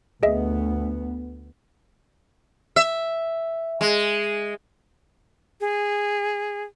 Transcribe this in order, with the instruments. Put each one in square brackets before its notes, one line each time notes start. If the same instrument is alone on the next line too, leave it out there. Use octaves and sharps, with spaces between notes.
[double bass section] D2 B3 [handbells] G#4 D#5 E5
[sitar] E5
G#3
[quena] G#4